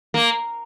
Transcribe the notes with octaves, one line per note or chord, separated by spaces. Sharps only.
A#3